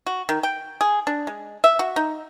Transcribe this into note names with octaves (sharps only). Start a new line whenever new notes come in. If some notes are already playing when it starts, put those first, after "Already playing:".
F#4
D#3
G5
G#4
D4
G#3
E5
F#4
D#4